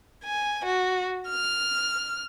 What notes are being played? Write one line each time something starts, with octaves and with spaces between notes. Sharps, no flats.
G#5
F#4
F6